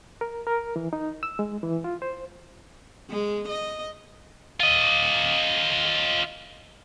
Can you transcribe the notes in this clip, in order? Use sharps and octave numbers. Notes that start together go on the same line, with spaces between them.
A#4
A#4
E3
D#4
E6
G#3
E3
F4
C5
G#3
D#5
F4 D#5